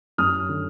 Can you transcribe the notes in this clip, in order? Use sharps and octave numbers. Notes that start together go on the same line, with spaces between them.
F#2 D#6 F6
D3